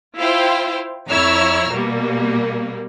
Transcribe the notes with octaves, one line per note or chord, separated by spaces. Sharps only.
E4 F4 C5 F5 G5
F2 E4 C#5 A#5 E6 F6
B2 G3 A#3